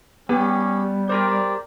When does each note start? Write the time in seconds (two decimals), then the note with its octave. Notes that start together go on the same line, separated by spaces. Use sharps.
0.29 G3 B3 C#4 G4
1.09 G4 A#4 C5 D5